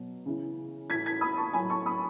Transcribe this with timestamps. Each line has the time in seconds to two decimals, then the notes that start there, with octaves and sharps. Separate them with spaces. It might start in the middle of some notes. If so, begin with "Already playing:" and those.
Already playing: B2 F#3
0.26 C#3 E3
0.90 A2 E3 G#6 B6
1.06 G#6 B6
1.21 B5 D#6
1.37 A5 C#6
1.53 A2 F#3 G#5 B5
1.69 A5 C#6
1.86 B5 D#6